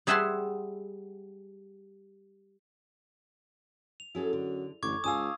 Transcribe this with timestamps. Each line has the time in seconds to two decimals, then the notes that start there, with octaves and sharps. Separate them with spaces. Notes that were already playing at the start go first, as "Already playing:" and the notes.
0.07 G3 G#4 E5 F#5 A5 C6
4.00 F7
4.15 F#2 E4 G#4 A4
4.33 D3
4.83 A1 F#2 D3 C#6 D6 G#6
5.04 C#2 F5 G#5 A5 D#6 E6